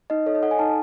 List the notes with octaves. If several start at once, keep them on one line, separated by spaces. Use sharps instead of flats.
D#4 D#5
A4 C#5
D#5
A4 F#5
G#5
D#4 A5